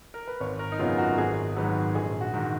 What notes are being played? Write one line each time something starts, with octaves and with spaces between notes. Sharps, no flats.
A#4
B4
G#1 C#5
A#4
D#4
F#2 C#3 F#3 B3 F4
F#4
G#1 G#4
G#2 D#3 F#3 B4
A#1 G#4
F#4
G#2 D#3